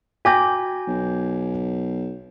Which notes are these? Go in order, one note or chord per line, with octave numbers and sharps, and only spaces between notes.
F#4 G5 G#5 D6 G6 A#6
B1